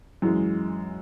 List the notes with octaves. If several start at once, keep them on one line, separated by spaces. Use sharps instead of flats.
F#2 E3 G#3